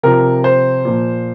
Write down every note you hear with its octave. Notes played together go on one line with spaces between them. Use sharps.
C3 F3 A#4
C5
A#2 F3